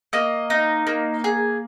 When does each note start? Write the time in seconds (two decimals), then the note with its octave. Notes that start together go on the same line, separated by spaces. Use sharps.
0.13 A#3 D#5
0.50 D#4
0.87 A#3
1.24 G#4